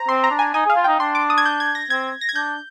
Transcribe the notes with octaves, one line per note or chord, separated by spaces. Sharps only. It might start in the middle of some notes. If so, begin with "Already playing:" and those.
Already playing: C5 A#5
C4 C6
A#5
D4
G#5
D#4 G#5
G#4 F5
F4
D#4 G5
D4 C6
D6
D#6
G#6
G6
G#6
A#6
C4 G#6
A#6
G#6
D4 G6